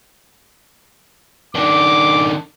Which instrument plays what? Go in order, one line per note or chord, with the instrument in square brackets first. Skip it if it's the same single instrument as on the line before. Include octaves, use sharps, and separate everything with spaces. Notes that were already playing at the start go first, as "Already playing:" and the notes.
[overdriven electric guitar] D#3 D4 [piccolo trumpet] D6